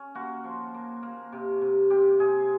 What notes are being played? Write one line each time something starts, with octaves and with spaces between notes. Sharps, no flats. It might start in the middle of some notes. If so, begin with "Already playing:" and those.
Already playing: C#4
A#3 F#4
F3
A#3
A#3
C3
C3
C3 G4
C3 G#4